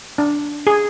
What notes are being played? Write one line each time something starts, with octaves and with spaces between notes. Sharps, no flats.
D4
G#4